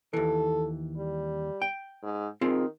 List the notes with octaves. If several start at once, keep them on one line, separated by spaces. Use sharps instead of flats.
D#2 E3 A4
G3
G5
G#2
D#3 C4 F4 G#4